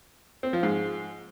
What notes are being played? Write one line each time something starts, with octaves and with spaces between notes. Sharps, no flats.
C4
F3
G#2